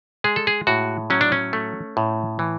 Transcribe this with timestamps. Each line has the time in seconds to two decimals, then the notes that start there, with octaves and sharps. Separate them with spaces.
0.24 G#3 G#4
0.36 A4
0.47 G#4
0.67 A2 F#4
1.10 F#3 C#4
1.21 D4
1.32 C#4
1.53 A3
1.97 A2
2.39 E3